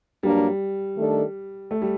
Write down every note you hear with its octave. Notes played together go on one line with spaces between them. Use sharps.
G2 F#3 G3 A#3 D4
D#3 A3 D4 A4
A3
G3